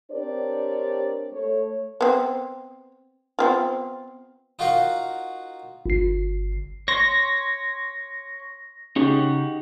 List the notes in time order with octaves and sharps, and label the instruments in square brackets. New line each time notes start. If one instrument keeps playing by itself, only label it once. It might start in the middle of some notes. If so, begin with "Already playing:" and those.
[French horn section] C4 D4 G4 A#4 C#5 D5
A3 C#5
[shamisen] B3 C4
B3 C4 F4
[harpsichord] D#4 F4 F#4 A#4 F5 F#5
[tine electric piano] G1 C7
[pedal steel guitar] C#5 C6 [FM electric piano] A#6
[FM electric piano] C#3 [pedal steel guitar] D#4 F#4 G4